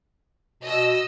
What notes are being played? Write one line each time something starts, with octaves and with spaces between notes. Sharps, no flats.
B2 D#5 E6